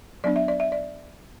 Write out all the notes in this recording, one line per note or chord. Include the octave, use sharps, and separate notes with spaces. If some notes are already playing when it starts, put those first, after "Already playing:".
F#3 B3 D4 D5
E5
D5
E5
D5